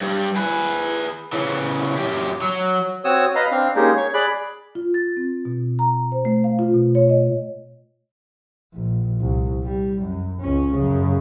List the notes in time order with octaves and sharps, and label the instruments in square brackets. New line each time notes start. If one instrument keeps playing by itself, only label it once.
[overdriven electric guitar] G2 G3
G#4 B4
C#3 E3
F#2 G4
F#3
[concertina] C4 F#4 C#5 D#6 E6
B4 D#5 F5 A#5
C4 D4 F5
G#3 A#3 C#4 D#4 G4 G#4
C#5 C#6
G#4 D5 B5 F#6
[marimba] F4
A6
C4
B2
A#5
C5
A3
F5
F4
B2
C#5
D#5
[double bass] A#1
C2
G3
F#2
C#2 C#4
F#2 C#3